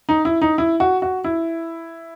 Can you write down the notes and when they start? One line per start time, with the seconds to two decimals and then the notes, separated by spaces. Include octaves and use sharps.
0.09 D#4
0.25 E4
0.41 D#4
0.58 E4
0.80 F#4
1.02 F#4
1.24 E4